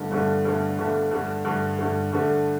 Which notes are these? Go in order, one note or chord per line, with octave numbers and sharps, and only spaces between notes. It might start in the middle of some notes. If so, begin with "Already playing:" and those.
Already playing: G1 G2 D3 A3
G1 G2 D3 A3
G1 G2 D3 A3
G1 G2 D3 A3
G2 D3 A3
G2 D3 A3
G2 D3 A3
G2 D3 A3